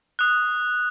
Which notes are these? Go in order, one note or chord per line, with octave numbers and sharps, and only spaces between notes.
D#6 F#6